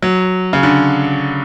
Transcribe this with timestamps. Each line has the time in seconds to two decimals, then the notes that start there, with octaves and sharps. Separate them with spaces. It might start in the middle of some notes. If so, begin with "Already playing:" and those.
0.02 F#3
0.53 C#3
0.63 D3